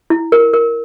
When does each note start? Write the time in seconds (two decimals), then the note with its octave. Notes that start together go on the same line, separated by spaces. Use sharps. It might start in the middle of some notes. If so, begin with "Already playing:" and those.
0.10 E4
0.32 A#4
0.54 A#4